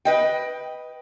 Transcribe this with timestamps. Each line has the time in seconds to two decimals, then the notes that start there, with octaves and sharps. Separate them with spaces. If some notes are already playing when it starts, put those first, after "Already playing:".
0.05 B4 D#5 G5